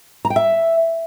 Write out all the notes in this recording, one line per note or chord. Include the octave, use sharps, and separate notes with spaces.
A#5
G5
E5